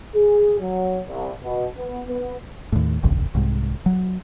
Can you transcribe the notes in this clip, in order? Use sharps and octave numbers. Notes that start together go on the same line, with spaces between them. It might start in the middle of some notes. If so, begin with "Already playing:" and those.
G#4
F#3
C2
B2
B3
B3
D#2 A2
F1 A#1 D#2 C#3
C2 G#2
F#3